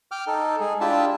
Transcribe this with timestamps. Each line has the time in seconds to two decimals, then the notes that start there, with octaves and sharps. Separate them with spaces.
0.12 G5 D6 F6
0.27 D#4 A4
0.60 G#3 G#4
0.81 D4 E4 F4 G4 E5 A5